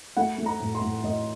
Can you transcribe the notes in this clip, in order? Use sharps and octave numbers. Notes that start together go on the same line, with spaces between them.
A3 F#5
A3
A#5
A2
C6
A2
A2 D#5